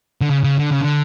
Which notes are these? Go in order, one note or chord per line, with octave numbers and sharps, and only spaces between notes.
D3
C#3
C#3
D3
C#3
D3